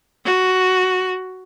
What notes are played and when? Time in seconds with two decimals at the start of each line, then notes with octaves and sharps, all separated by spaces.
0.25 F#4